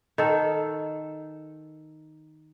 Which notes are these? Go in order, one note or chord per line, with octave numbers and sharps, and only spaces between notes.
D#3 A4